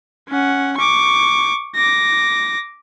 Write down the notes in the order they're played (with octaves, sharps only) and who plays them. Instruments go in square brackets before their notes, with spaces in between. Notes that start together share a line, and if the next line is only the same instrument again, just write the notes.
[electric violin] C#4 F#5
C#6 D6
D6 A#6